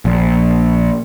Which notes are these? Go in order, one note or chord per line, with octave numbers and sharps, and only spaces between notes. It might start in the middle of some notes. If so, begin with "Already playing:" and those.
A#1